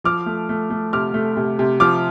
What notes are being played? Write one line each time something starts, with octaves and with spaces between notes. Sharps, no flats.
F3 D6 F6
A3
A3
A3
C3 D6 F6
A3
C3
C3
F3 D6 F6